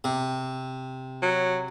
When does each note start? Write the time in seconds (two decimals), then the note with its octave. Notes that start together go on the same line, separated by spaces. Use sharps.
0.04 C3
1.22 F#3